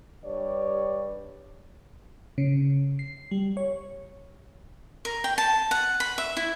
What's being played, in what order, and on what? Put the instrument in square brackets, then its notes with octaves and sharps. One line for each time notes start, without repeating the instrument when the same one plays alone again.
[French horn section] G2 G3 C#5 D5
[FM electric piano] C#3
C7
G3
C#5
[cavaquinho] A#4
G5
A5
F#5
B5
E5
E4